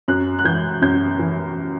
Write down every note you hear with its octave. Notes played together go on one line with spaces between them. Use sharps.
F#2 F#6
F#6
E3 G6
F#2 G6
E3